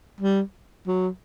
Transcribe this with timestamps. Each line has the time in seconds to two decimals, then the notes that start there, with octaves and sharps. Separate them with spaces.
0.21 G3
0.87 F#3